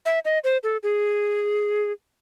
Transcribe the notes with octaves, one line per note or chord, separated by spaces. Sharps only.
E5
D#5
C5
A4
G#4